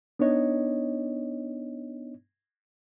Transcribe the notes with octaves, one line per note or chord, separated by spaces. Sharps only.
B3 D4 D#4 C#5 D#5